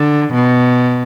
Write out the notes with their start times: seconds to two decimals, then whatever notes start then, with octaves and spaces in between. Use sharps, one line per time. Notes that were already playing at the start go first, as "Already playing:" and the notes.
Already playing: D3
0.34 B2